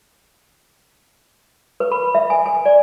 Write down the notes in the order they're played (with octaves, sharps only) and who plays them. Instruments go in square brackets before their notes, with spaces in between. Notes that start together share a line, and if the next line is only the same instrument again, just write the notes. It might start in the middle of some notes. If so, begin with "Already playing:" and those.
[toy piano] B4
B5
E5
G#5
G#5
D5